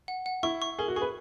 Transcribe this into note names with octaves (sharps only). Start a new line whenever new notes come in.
F#5
F#5
E4 C#6
C#6
G#4 A#4
F#4
G#4 C#6
B4